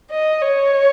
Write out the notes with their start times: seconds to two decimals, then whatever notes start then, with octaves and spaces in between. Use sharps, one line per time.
0.11 D#5
0.42 C#5